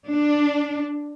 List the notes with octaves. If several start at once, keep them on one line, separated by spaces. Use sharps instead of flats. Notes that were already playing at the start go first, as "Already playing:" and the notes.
D4